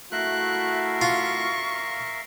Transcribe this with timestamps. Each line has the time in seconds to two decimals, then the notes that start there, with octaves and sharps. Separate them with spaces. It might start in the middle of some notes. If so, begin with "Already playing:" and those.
0.12 A3 E4 F#4 A#4 E5 F5 F#6
1.01 F4 C#6